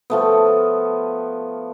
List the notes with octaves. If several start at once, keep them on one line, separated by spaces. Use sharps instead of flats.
F3 A3 B3